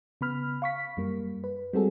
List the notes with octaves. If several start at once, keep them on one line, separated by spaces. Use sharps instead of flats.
C#3 B3 B5 F6
F5 C#6 B6
F#2 G3 A#3
B4
G3 G#3 C4 F#4 G#4 A4